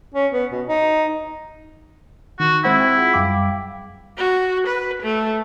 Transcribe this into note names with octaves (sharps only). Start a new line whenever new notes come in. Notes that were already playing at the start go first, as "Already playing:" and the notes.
C#4
B3
B2
D#4
D#3 F#4
G#3 C4 E4 C5 F#5
G5
F4 G#4 F#5
F#2 G3 F5 G5 D6
F#4
B4
A3